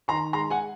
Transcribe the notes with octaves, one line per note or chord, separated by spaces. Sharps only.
D#3 A#5 C6
G#3 A#5 C6
F#5 G#5